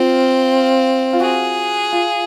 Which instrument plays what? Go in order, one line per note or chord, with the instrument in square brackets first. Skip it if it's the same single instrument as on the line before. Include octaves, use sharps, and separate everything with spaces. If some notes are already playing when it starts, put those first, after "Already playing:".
Already playing: [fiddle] C4 [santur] F4
[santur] F4
[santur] F#4 [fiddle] G#4
[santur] F4